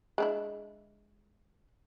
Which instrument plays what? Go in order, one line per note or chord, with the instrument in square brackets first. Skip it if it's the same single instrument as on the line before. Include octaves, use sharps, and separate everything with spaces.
[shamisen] G#3 D4 E4